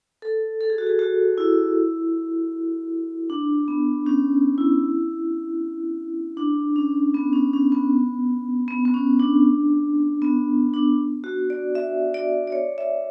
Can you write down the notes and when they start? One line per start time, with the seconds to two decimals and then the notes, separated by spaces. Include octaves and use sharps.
0.22 A4
0.61 A4
0.70 G#4
0.78 F#4
0.87 G#4
0.99 F#4
1.38 E4
3.30 D4
3.68 B3
4.06 C#4
4.58 E4
6.37 D4
6.76 C#4
7.14 B3
7.33 C#4
7.53 C#4
7.72 B3
8.68 B3
8.85 B3
8.94 C#4
9.20 D4
10.22 B3
10.74 D4
11.24 F#4
11.50 D5
11.75 E5
12.14 D5
12.47 D5
12.52 C#5
12.78 E5